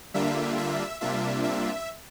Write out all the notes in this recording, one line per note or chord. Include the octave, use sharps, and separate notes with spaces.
D3 G3 A#3 D4 F4 E5
E5
C3 G3 A#3 D4 F4 E5
E5